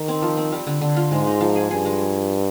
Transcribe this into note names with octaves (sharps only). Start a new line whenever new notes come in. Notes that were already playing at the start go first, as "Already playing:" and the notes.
Already playing: D#3 D#4
C4
F3
C4
G3
D3
D3
F4
G#2 G#3
D#4
F3
G#4
G2 G#4
G#3